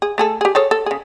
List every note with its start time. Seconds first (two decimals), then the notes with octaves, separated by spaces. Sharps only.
0.02 G#4
0.18 A3 G#4 A4
0.41 G4 G#4
0.55 G#4 A4 C#5
0.71 A4
0.86 C#3 G#4